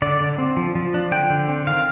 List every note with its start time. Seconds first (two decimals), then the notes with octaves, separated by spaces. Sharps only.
0.02 D3 D5
0.21 D3
0.38 C4
0.57 F3
0.75 F3
0.94 D4
1.12 D3 G5
1.30 D3
1.48 C4
1.67 D#3 F5